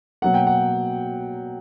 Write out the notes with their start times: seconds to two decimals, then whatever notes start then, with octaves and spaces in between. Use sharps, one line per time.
0.22 B2 F#3 A#3 F#5
0.34 G5
0.47 F#5